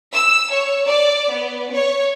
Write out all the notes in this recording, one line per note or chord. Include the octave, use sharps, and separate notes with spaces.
E6
C#5
D5
B3
C#5